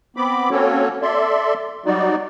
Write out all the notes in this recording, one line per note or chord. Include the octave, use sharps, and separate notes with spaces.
B3 C4 B5 D6
A#3 C4 C#4 F#4 A4 C#5
A4 D5 E5 C6
F#3 G3 D#4 F#4 D5